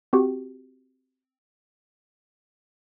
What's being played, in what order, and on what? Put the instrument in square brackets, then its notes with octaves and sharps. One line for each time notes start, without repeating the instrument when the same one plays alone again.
[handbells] C4 F#4 G4